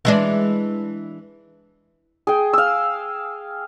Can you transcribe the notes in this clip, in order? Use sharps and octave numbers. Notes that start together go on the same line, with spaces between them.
E3 G#3 D4
G#4 G5
F5 E6